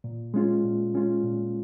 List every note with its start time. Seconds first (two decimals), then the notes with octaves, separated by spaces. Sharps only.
0.04 A#2
0.34 G#3 C#4 F4
0.64 A#2
0.94 G#3 C#4 F4
1.24 A#2